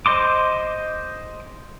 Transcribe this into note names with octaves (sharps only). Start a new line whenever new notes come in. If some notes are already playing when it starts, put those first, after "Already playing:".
C5 D#5 C6 D6